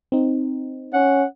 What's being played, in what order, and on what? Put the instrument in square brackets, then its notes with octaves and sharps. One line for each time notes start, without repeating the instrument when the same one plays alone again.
[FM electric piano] C4 D#4
[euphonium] C#4 [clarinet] F#5